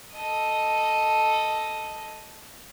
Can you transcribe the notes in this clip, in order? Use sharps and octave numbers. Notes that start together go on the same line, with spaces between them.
A4 D#5